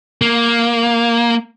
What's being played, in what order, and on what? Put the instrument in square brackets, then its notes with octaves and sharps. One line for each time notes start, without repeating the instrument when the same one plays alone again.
[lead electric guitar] A#3